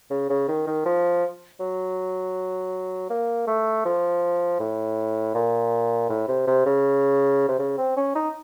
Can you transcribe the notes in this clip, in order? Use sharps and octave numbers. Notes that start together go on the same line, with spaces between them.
C#3
C#3
D#3
D#3
F3
F#3
A#3
A3
F3
A2
A#2
A2
C3
C3
C#3
C3
C#3
C4
C#4
D#4